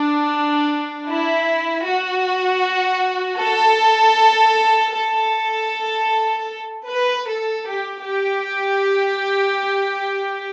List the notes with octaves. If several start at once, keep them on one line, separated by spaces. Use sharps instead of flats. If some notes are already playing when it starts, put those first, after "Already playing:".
Already playing: D4
E4
F#4
A4
A4
B4
A4
G4
G4